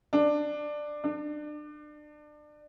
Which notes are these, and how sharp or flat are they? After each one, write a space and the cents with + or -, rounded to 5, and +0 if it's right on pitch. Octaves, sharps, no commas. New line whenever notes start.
D4 +15
D4 +30